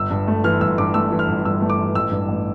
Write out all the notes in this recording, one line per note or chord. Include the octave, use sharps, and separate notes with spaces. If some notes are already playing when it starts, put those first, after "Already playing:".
Already playing: G1 E6
G2
A3
E3 F6
G1 E6
G2 D6
A3 E6
E3
F6
G1
G2 E6
A3
D6
E3
A1 E6
G2
A1